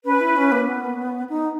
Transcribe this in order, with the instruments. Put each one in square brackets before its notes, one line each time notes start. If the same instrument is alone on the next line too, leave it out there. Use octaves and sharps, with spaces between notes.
[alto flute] C#4 [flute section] B4
[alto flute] E4
C#4
A#3
B3
D#4